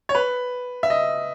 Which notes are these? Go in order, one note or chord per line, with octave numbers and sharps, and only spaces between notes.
C#5
B4
E5
D#5